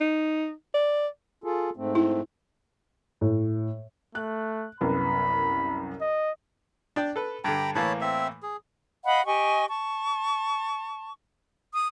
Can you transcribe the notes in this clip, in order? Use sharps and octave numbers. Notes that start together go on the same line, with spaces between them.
D#4
D5
F4 G#4 A4
G#2 A3 C4
E4
A2
A3 F#6
C2 F#2 B3 B5
D#5
D4 D5 G5
A4 B4
G2 D3 G5 A#5 B5
A2 E3 A#3 C#5 A5 B5
C4 E5
G#4
D#5 F5 F#5 B5
G4 D#5 G#5 C#6
A5 C#6
D#6